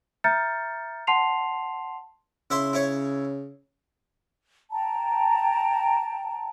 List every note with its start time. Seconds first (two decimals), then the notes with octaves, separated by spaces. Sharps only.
0.24 E5 A#5 F6 G6 A6 C#7
1.07 F#5 A5 C6 C7 F7
2.50 C#3 E4 E5 C6
2.73 E4 C#5
4.71 G5 A5 A#5